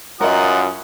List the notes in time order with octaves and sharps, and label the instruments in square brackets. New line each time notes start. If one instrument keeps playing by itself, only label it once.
[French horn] F#2 [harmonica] F4 D#6 [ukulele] A#4 D#5 [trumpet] F#5